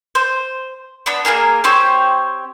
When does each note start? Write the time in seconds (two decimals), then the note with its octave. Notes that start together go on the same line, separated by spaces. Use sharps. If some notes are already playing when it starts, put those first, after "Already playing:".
0.15 C5
1.06 B3 D4 B5
1.25 A#3 D4 G#4 A#4
1.64 C4 G4 C5 C#5